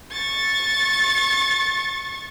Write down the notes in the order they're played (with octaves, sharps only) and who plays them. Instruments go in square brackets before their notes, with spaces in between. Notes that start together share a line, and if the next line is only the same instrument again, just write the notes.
[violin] C#6 A6